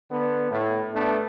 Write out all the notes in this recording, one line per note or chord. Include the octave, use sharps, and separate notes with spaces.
D3 B3
A2
A3 B3 D4